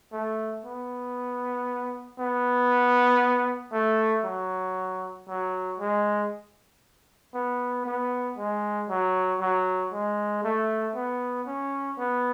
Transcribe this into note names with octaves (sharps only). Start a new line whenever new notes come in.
A3
B3
B3
A3
F#3
F#3
G#3
B3
B3
G#3
F#3
F#3
G#3
A3
B3
C#4
B3